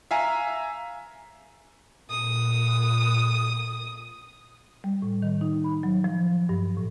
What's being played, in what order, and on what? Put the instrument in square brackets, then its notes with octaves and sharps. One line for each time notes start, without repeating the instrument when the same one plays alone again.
[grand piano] E5 F5 G#5 A#5
[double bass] A#2 [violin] D#6
[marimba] G3
A2
D#3
D#4
B5
F#3
F3
G2
A2